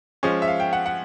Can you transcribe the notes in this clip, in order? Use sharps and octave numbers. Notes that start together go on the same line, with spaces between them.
F3 G#3 C#4
E5
F5
G5
F#5
F#5